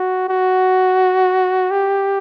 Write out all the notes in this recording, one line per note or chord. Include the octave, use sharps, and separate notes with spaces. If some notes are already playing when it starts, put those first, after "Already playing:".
Already playing: F#4
F#4
G4